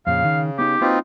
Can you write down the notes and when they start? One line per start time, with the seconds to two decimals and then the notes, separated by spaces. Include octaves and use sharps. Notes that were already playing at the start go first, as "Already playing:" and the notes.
0.07 F2 A#2 C#3 F5
0.25 D#3
0.59 B3 D#4 G4
0.81 A#3 C4 D#4 F4 F#4 B4